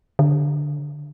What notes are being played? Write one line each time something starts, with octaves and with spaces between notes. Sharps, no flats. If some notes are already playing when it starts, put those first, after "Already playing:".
D3